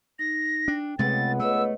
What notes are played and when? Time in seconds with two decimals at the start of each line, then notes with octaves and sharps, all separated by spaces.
0.19 D#4 A#6
0.68 D4 G5
0.99 C#2 C3 G#3 A3 B3 A6
1.40 A3 B4 C#5 D#5 E6